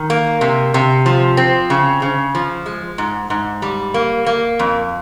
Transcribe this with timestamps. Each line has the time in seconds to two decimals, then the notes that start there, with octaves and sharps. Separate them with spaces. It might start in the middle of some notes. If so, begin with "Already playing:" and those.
Already playing: D#3
0.10 A#3
0.41 C3
0.74 C3
1.06 F3
1.37 C4
1.70 C#3
2.02 C#3
2.35 F3
2.66 G#3
2.98 G#2
3.30 G#2
3.62 G3
3.94 A#3
4.26 A#3
4.59 F2